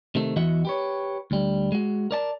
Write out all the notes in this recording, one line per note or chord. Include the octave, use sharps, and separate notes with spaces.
C3 D#3 A3
E2 E3 F#4 D#5 E5 F#5
G4 B4 C#5
D2 G3
G#3 F#4
A#4 D5 A5